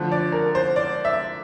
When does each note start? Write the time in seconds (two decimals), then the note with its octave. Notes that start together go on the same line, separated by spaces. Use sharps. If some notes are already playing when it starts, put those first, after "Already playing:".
Already playing: D3 F3 A3
0.12 D5
0.32 A#4
0.55 C5
0.76 D5
1.05 E5